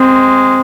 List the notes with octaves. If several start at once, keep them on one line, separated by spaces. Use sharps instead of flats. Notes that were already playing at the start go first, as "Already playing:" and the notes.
Already playing: G#3 C4